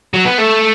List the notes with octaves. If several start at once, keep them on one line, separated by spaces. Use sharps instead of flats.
F#3
B3
A3